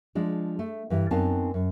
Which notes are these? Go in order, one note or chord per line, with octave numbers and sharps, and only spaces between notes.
F3 G#3 D4
A3
G2 E3
F#2 B3 C4 D#4 F5 A5
F#2